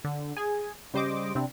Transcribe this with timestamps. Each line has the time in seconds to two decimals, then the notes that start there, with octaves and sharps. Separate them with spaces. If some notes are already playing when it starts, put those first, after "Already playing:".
0.04 D3
0.37 G#4 G#5
0.94 C#3 G3 C5 D#5 D6
1.35 C3 C4 D4 E4